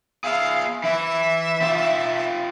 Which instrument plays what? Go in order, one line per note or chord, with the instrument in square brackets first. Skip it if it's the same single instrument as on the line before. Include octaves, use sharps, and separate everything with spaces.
[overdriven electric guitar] G#4 E5 [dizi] F5
[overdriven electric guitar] E3 [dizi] E5
[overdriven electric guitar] F4 G4